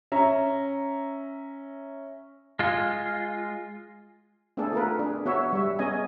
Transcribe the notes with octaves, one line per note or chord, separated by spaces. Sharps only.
C#4 E5 A#5
G#3 F4
A3 B3 C4 D4 G#4 A4
F4 A#4 B4
D4 G#4
B3 F#4 C#5 E5
G3 E5
B3 C#4 G#4 D#5 G#5